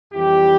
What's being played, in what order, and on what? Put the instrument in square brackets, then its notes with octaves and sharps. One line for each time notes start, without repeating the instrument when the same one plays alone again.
[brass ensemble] F2 E3 G3 E4 G4